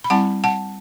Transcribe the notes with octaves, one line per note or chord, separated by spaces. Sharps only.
B5
G3 C4 E4 F#5 A5
F#5 A5